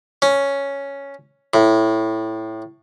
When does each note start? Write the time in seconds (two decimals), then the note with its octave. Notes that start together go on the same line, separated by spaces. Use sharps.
0.22 C#4
1.54 A2